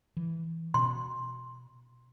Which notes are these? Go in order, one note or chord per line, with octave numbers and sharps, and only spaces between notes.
E3
B2 C6